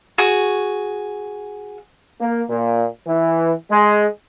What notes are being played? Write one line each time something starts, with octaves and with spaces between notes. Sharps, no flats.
F#4 G#4
A#3
A#2
E3
G#3